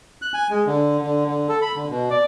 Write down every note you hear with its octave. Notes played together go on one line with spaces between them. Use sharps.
F#6
G#5
G#3
D3
D3
D3
A4
B5
D3
B2
D5